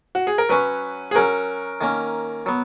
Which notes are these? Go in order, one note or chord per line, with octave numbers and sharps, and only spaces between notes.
F#4
G#4
A#4
F#3 C#4 F#4 B4
G#4
F#3 C#4 F#4 A#4
D#3 A#3 C#4
F#3 B3